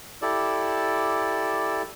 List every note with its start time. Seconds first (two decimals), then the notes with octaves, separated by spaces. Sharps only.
0.22 E4 G4 A4 D5